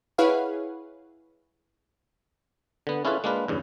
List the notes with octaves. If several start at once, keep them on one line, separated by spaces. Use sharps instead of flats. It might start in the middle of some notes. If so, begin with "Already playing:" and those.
E4 G#4 B4 C#5 F5 F#5
D3 B3
C#4 E4 F4 G#4 A4 B4
G#3 A#3 D4 F4 B4
E2 G2 C#3